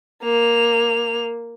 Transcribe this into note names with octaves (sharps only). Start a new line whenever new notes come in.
A#3 F7